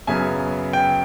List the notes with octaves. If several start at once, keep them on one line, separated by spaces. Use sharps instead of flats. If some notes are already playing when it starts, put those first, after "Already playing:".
F#2 C#3 F#3 B3 G#5
G5